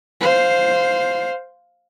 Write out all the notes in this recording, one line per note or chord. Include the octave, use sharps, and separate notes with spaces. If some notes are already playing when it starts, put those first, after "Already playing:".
C5 F5